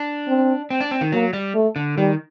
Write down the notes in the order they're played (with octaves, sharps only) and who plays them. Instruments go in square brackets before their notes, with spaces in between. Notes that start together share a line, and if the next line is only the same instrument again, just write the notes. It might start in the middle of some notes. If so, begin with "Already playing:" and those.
Already playing: [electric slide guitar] D4
[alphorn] C4
[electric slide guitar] C4
D4
C4
D#3
[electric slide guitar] F#3 [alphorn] A#3
[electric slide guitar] G3
[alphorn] A3
[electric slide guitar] D3
[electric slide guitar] D#3 [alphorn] G3